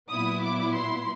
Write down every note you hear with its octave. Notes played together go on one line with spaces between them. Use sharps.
A#2 F#3 B3 E4 D#6
D6
C6